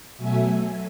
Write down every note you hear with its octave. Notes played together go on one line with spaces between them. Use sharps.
B2 F#3 A3 E5 G#5